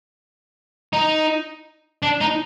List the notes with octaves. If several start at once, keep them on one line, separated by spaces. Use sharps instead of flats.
D#4
D4
D#4